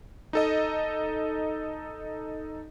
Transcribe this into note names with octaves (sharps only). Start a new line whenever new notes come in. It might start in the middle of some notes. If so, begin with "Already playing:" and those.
D#4 A4 D#5